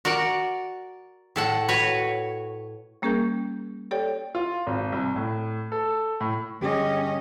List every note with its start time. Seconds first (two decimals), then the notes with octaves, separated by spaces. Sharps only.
0.05 F#4 A#4 D5 F#5
1.36 A2 A4 F#5
1.69 F#4 B4 C#5
3.02 G3 A#3 C#4 G#4 A#4 G6
3.91 G4 A4 C#5 D5 G5
4.35 F4
4.67 G#1
4.92 C2
5.16 A2
5.72 A4
6.21 A2
6.61 G1 C#4 G4 G#4 D#5